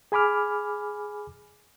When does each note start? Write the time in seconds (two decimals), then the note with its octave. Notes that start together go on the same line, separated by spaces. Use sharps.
0.12 G#4 G#5 B5 D6 F6